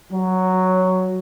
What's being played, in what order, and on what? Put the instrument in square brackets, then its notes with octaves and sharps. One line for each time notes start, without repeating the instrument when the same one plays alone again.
[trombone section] F#3